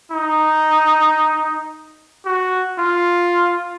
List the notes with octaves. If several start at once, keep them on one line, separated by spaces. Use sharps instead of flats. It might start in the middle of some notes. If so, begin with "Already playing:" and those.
D#4
F#4
F4